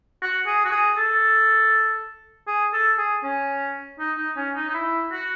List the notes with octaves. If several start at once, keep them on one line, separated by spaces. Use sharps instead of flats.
F#4
G#4
F#4
G#4
A4
G#4
A4
G#4
C#4
D#4
D#4
C#4
D#4
D#4
E4
F#4